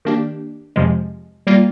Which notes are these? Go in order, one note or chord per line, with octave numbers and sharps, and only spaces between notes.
D#3 A#3 D4 G4
F2 C3 F3 G#3
G3 A#3 F4